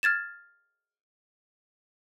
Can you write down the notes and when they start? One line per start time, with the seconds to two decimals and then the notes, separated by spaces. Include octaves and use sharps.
0.03 F6 G#6 A6 E7